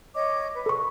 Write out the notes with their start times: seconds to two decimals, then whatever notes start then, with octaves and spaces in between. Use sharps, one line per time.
0.14 C#5 D#5 D6
0.53 B4
0.66 A4 C#6